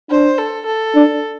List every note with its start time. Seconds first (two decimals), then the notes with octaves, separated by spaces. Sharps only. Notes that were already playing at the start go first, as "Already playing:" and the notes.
0.11 D4 C5
0.38 A4
0.66 A4
0.95 D4